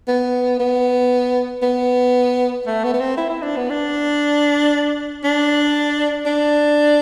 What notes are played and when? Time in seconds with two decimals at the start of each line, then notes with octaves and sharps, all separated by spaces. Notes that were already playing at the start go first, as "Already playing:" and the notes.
0.08 B3
0.60 B3
1.62 B3
2.66 A3
2.84 B3
2.94 B3
3.00 C4
3.17 E4
3.30 E4
3.43 D4
3.57 B3
3.69 D4
5.24 D4
6.26 D4